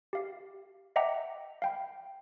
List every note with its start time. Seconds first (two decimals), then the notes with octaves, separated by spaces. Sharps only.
0.13 G4 F5 C7
0.96 D#5 E5 F#5 G5 A#5 D6
1.62 F5 G5 B5